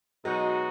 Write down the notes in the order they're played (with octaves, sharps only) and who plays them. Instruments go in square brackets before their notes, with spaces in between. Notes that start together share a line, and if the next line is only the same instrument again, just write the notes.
[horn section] B2 G#3 D#4 F#4 [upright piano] F#3